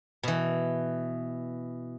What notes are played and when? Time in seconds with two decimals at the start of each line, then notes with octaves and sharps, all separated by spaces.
0.23 B2 E3